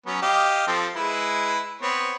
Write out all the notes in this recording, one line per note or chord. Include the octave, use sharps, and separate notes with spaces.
F#3 B3 C#4
G4 D#5 F5
F3 C4 A4
G#3 E4 B4
B3 C4 C#5